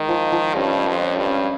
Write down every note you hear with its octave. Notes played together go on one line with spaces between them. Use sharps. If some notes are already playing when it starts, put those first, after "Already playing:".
Already playing: D#3 G#3
F3
F3
G2 C#4
C#4
F2
C#4
G2
C#4